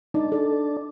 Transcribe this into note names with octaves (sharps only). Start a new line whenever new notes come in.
D4 D#4
A4 D5